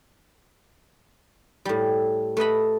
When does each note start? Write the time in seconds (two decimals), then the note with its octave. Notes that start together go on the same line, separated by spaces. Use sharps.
1.65 A2 G3
2.37 A3 B4 D#5 B5